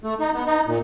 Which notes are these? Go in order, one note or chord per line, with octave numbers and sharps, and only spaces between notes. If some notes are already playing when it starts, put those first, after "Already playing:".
A3
D#4
B3
D#4
A#2